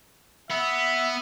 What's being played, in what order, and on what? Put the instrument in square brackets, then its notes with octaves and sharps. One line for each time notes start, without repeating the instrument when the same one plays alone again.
[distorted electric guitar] B3 [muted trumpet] E5